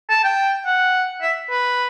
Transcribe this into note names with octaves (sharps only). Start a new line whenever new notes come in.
A5
G5
F#5
E5
B4